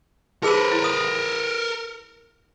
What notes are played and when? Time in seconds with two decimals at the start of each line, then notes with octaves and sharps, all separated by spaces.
0.43 D#4 G#4 A#4 B4 E6
0.72 E4
0.84 D#6